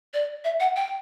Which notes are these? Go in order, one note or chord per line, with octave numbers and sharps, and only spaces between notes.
D5
E5
F#5
G5